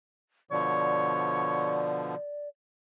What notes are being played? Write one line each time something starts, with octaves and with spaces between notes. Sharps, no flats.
B2 D3 F3 C#5 D5